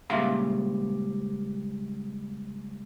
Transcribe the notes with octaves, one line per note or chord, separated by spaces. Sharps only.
C#2 A#2 G3 E5 F5 A#5